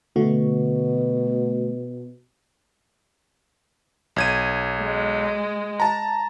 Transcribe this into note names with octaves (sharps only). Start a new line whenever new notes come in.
B2 D3 A3 F#4
B1 G#6 D#7
G#3
A5 A#5